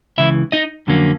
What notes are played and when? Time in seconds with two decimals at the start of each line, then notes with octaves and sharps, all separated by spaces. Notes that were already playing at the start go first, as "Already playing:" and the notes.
0.18 C#2 C#3 E3 E4 E5
0.52 D#4 D#5
0.87 F2 D3 F#3 A#3 C#4